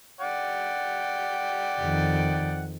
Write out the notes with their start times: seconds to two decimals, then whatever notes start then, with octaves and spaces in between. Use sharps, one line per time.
0.21 D5 F#5 G5
1.80 F2 D#3